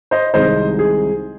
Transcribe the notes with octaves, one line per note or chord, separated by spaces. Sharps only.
C5 D#5
C2 C3 D#3 G#3 C5 D#5
G#4